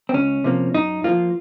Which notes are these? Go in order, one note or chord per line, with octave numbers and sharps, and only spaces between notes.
C4
C#2 C#4
C3 F3 A#3
F#2 D#4
F3 A#3 F4